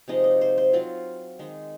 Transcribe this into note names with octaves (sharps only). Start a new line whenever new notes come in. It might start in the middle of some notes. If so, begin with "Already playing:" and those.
C3 F3 G#3 D#4 D#5
D#5
C5
C5
F#3 C4 F4
D#3 G#3 D#4